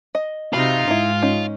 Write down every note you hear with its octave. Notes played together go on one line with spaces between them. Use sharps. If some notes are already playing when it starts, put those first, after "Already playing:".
D#5
C3 D#4 F4 F#4 B5
G#2 D#4 E4
C#4 D#4